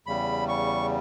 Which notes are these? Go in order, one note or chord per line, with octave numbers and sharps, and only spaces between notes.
E2 C#3 G3 B5
C#6